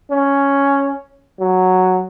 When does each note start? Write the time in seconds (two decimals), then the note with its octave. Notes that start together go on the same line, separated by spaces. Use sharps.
0.11 C#4
1.40 F#3